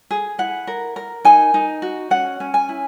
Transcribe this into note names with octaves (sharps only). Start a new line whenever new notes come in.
G#4
E4 F#5
A#4
A#4
D#4 G#5
D#4
F#4
C#4 F#5
C#4
G#5
E4